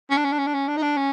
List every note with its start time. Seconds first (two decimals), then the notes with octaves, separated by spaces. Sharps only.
0.10 C#4
0.17 D4
0.25 C#4
0.32 D4
0.39 C#4
0.47 D4
0.54 C#4
0.68 D4
0.77 D#4
0.82 D4
0.97 C#4